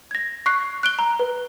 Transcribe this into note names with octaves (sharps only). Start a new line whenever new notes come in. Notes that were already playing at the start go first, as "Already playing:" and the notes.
G#6 A#6
C#6 F#6 C7
F#6 D7 G7
A#5
B4